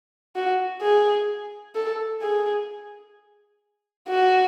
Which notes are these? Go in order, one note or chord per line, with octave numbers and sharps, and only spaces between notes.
F#4
G#4
A4
G#4
F#4